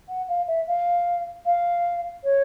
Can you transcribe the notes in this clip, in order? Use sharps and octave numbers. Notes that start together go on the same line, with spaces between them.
F#5
F5
E5
F5
F5
C#5